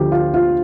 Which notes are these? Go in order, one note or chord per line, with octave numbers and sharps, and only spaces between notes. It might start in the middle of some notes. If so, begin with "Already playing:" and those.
Already playing: D2 D3 F3 G4
F4
F4